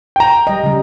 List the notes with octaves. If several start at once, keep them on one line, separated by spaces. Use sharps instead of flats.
G5 A#5
G3 D#5
C#3 G3